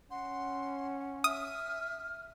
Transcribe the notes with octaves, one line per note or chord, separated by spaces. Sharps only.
C#4 F#5 C6
E5 D#6 F6